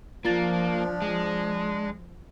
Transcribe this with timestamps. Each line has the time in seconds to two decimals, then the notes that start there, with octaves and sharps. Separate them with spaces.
0.25 F3 A#3 D4 F4 A6
1.02 G#3